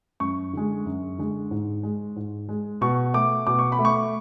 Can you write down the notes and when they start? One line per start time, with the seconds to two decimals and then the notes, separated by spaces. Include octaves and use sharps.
0.20 F#2 C#6
0.53 D3 G#3
0.86 F#2
1.18 D3 G#3
1.51 G#2
1.83 G#3
2.16 G#2
2.49 G#3
2.81 B2 C#6
3.14 A3 D6
3.47 B2 D6
3.59 C#6
3.72 B5
3.79 A3
3.85 C#6